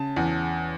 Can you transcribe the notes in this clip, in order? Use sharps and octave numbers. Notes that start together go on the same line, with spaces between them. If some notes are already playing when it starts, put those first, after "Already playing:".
Already playing: C#3 A5
E2